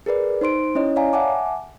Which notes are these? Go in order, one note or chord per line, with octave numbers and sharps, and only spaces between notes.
G#4 A#4 B4 D5
D#4 C5 C6 D7
C#4 E4 C#5 D#5
C#5 D5 F5 G#5 A#5
E5 F#5 G#5 A5 D6